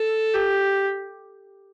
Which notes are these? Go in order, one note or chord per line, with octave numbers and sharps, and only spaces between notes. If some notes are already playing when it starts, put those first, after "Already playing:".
Already playing: A4
G4